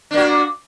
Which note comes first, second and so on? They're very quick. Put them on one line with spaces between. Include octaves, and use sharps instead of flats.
D4 A#3 F#4